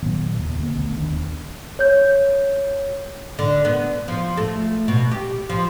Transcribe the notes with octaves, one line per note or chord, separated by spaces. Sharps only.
A#2 D#3 F#3 B3
D#2 C#3
D2 D3 A#3
A#1 D3 A3 B3
D#1 D#3 D4
D#2
C#5 G6
D3
B3
F3
A3
B2
G4
F3